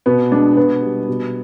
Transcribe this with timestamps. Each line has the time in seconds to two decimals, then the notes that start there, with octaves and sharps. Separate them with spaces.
0.06 B2 B3
0.31 G#3 D4
0.56 B2 B3
0.82 G3
1.08 B2